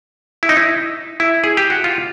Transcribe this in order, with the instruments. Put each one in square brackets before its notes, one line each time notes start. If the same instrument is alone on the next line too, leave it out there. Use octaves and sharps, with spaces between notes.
[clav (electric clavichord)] E4
D#4
E4
E4
G#4
G4
F#4
F4